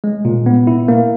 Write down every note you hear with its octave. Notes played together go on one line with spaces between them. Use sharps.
G#3
A#2
B3
E4
A#3